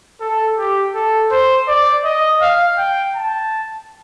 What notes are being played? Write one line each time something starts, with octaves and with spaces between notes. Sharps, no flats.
A4
G4
A4
C5
D5
D#5
F5
G5
A5